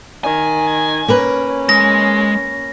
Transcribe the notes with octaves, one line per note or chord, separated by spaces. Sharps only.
D#3 G#5
A#3 C#4 A#4 B4
G#3 A#6